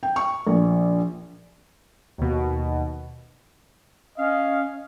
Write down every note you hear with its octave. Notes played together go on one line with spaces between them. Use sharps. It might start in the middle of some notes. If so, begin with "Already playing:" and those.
G5
C#6
A#1
D#2 B2
C#4 D#5 F5